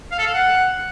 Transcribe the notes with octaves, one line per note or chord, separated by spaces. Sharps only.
F5
A4
F5
F#5